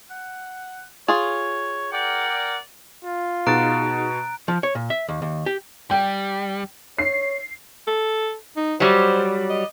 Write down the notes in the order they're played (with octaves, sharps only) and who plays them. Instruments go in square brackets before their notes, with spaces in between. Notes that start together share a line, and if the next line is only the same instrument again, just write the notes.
[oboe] F#5
[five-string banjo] F4 G#4 [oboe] C#5
[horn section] A#4 D5 F#5 [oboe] G5
[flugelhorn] F4
[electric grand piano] B2 A6 [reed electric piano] D#4 F#4 G#4 [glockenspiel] A#5 F#6 D7
[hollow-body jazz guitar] F3
C#5
A#2
E5
D#2
D#2
G4
[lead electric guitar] G3 [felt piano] G5
[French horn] C#5 [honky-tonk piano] C7
[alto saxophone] A4
D#4
[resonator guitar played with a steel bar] F#3 G3 [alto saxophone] C5
[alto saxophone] D#5